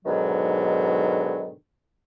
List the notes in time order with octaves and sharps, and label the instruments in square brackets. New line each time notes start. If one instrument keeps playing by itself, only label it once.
[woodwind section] G#2 B2 D3 D#3 F#3